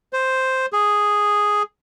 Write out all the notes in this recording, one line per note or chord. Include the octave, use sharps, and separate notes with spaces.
C5
G#4